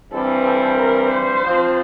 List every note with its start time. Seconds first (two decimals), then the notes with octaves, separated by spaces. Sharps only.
0.12 G2 E3 G3 C4 A4
0.45 A4
0.78 A#4
1.11 C5
1.43 F3 C4 F4